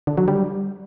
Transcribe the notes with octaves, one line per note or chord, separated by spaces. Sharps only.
D3
F#3
G3